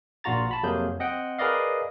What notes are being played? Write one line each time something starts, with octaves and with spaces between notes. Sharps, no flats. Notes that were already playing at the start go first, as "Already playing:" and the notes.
A#1 A#2 F4 F#4 A#5 A6
A5 B5
F2 C3 F#3 A#3 G#4 G6
C4 D#5 F#5 G5
G#4 A#4 B4 D5 D#5 F5